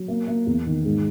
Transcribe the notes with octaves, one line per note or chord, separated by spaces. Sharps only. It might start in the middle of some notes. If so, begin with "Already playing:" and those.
Already playing: F#3
A#3
A#3
E2
D#3
G#2